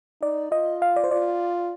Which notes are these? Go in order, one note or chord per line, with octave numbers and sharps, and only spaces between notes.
D#4 D5
F4 D#5
F5
D5
C5
F4 D5